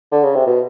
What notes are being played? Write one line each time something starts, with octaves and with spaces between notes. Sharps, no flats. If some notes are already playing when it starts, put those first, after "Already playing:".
D3
C#3
C3
B2